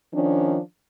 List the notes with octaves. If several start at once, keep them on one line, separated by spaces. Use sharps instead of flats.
D#3 F3 C#4 D4